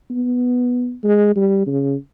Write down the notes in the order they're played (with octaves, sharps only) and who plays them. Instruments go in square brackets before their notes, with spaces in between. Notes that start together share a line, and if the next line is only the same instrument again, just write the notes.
[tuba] B3
G#3
G3
C#3